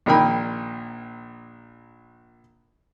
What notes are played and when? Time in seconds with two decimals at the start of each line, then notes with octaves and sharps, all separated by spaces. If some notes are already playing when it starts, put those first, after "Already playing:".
0.06 A#1 A#2 D#3 A#4 G5 B5